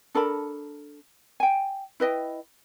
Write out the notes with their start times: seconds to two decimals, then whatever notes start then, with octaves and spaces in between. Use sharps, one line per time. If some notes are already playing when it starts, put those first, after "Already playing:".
0.15 D4 A4 A#4 B5
1.40 G5 G#5
2.00 E4 B4 D#5 G5